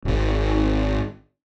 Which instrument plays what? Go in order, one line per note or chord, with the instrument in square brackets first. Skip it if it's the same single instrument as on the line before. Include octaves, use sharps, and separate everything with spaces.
[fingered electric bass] D1 G#1